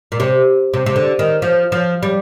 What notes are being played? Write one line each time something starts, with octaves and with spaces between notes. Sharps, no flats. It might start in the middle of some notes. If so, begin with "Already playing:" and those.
A#2
C3
C3
C3
D3
D#3
F3
F3
G3